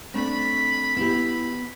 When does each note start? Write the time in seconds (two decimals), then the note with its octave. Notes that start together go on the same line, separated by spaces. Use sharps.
0.14 A3 C4 D4 B5
0.97 B3 E4 G4